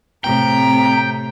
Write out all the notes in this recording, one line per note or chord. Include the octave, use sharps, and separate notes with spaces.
A2 C3 G5 A#5